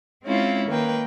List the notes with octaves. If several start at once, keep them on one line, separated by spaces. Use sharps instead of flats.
G#3 C4 C#4 E4 F4
D#3 A#3 B4 G5